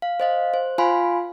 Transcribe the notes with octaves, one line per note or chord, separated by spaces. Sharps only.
F5
C5 D#5 F5
C5
F4 F5 G#5 B5 C6